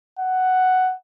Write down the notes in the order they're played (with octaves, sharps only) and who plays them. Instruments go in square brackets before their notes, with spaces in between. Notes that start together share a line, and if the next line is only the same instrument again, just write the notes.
[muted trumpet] F#5